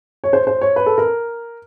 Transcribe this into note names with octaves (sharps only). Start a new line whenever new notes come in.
C#5
C5
C5
C#5
B4
A4
A#4